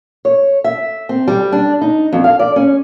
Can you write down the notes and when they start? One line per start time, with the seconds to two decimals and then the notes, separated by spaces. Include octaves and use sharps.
0.25 C#5
0.64 E5
1.09 C4
1.28 G3
1.52 D4
1.81 D#4
2.13 F2
2.24 F5
2.39 D5
2.56 C#4